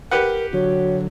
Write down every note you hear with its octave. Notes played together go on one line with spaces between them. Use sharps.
G4 A#4 B4 F#5
D3 F#3 F#4 C#5